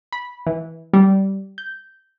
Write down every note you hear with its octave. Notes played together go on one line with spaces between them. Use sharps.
B5
E3
G3
G6